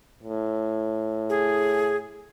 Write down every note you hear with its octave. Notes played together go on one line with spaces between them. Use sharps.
A2
G#4